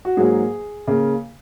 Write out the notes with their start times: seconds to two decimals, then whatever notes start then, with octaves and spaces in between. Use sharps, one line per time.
0.05 F#4
0.17 G#2 F#3 A#3 G#4
0.87 C#3 A#3